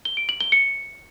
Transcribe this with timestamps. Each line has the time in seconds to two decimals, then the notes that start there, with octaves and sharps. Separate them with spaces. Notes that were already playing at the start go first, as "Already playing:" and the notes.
0.05 G7
0.17 D7
0.29 F#7
0.40 G7
0.52 C#7